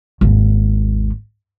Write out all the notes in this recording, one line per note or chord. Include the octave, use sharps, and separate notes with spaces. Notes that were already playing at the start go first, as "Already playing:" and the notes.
G#1 D#2